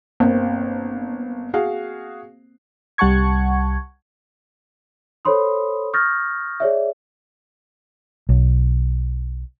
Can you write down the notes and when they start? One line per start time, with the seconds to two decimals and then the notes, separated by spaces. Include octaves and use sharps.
0.20 G1 A#3 C4
1.54 F#4 G#4 F5
2.98 C2 G3 F#5 A5 C#6 G#6
5.25 A4 C5 C#5 B5 C6 D#6
5.93 C#6 D#6 F6 G6 A6 A#6
6.60 G#4 C#5 D5 E5
8.29 B1